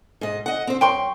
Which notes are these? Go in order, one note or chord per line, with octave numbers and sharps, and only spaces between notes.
G#2 D#5
D#5 F#5
C4 C5
F#2 G5 C6 C#6